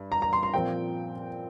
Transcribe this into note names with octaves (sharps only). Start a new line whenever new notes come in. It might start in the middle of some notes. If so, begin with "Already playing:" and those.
Already playing: G2
A#5
A#5
C6
C6
A#2 F3 C4 G5